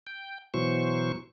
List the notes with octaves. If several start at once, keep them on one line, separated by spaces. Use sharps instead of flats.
G5
B2 E3 F#3 C5 C#6